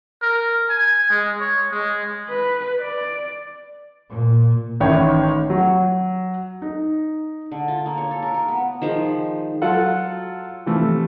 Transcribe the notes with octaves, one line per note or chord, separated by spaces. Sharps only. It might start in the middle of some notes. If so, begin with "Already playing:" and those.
A#4
G#5
G#3
C#5
G#3
B4
D5
A#2
A1 D#3 E4 C#5 G5
F#3
D#4
D3
F4
A#3
C#5
A4
A#4
A#4
B3
D#3 F3 G#3
F#3 F4 A4 F#5
C3 E3 F3 A3